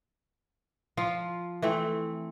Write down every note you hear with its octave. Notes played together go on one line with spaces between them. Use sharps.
F3 F4
E3 A3 C4